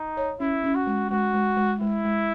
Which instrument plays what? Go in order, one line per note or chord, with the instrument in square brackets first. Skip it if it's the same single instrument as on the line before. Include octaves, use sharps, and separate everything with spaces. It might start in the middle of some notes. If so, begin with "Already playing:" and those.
Already playing: [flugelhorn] D#4
[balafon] C#5
[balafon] C#4 [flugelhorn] E4
[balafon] C#4
[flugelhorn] F#4
[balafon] G#3
[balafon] G#3 [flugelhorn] F#4
[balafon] G#3
G#3
[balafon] G#3 [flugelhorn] E4
[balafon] G#3